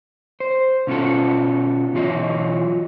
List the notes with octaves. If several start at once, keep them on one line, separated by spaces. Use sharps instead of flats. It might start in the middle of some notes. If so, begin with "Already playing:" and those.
C5
B2 C#4 F4 F#4 A4
B2 E3 F#3 F4 D#5